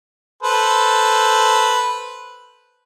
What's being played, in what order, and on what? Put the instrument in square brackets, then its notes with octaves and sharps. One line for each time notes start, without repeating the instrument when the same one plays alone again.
[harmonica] A4 B4 C5